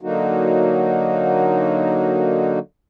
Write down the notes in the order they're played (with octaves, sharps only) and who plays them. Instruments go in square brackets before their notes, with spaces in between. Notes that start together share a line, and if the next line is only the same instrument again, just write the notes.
[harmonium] D3 F#3 A#3 D#4 F#4